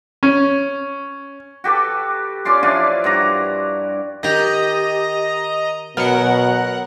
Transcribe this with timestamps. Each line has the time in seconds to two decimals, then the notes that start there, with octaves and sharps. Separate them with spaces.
0.23 C#4
1.64 F#4 G4 A4 B4
2.45 C#4 F4 D5 C6
2.63 F3 D4 E4 F4
3.04 G2 F#4 A#5
4.23 D#3 G4 D#5 A#5
5.97 B2 F#3 B3 A#4 F#5